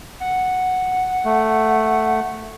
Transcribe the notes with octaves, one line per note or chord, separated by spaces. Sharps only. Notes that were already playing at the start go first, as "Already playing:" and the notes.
F#5
A3